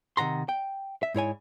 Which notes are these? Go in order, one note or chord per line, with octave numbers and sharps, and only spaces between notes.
C3 D#3 F#5 A#5 C6
G5
E5
G#2 E4 C#5 G#5